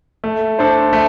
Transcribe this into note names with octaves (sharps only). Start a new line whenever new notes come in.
A3
D4 A4 C5
A3